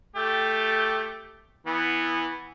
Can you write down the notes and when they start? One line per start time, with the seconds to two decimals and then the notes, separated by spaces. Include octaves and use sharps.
0.16 A3 G4
1.67 E3 B3